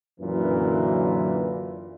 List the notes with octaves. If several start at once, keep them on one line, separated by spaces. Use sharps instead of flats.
F#2 A#2 D3 E3